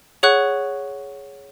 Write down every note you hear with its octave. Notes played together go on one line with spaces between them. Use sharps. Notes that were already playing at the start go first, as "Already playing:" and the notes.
G#4 C#5 F#5 C#6 F#6